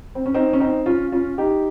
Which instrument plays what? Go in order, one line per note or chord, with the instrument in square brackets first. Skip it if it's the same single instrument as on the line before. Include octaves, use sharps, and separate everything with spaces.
[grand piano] C4
C#4
C4 D#4
C#4
C4 D#4
C#4 F4
C#4 F4
D#4 G4